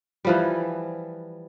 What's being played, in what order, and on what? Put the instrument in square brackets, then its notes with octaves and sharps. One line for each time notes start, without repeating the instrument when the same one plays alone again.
[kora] E3 F3 G3